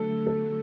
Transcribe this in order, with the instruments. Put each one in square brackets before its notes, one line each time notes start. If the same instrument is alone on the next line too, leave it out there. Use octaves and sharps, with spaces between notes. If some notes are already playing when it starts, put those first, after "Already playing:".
Already playing: [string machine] D3 F#3 A3 [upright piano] A4
[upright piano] A4